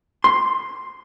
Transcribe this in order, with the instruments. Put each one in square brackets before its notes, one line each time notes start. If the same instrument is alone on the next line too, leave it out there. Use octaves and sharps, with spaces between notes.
[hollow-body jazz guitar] C6